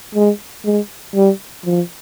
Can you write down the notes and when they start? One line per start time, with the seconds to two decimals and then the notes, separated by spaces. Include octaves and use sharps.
0.15 G#3
0.65 G#3
1.15 G3
1.65 F3